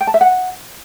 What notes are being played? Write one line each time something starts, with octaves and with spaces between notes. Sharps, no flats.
G5
A5
E5
F#5